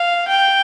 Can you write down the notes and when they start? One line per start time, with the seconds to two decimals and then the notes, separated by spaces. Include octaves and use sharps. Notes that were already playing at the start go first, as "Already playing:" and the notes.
Already playing: F5
0.28 G5